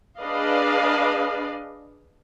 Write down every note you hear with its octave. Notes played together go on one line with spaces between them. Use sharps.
D4 G#4 B4 D5 D#5 F5